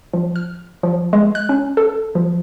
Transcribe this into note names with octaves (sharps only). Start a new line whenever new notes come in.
F3
F6
F3
G#3
F#6
C#4
A4
F3